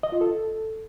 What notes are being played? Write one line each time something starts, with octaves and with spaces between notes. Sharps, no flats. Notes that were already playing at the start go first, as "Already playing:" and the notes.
D#5
F4
A4